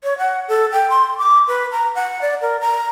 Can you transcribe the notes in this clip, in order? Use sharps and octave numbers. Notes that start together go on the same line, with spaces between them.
C#5
F#5
A4
G5
C6
D6
B4
A#5
F#5
D5
A#4
A#5